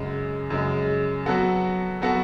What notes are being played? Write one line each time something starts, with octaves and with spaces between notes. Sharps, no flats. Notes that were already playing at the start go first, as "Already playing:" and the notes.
Already playing: F#2 C#3 G#3
F#2 C#3 G#3
F#3 B3 F#4 A4
F#3 B3 F#4 A4